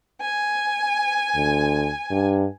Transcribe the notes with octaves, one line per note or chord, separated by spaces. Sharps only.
G#5
D2
G2